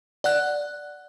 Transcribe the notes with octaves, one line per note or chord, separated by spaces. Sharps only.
D5 F#5 F#6